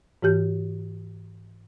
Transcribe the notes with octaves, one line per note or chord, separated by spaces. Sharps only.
G#2 E3 G4 G6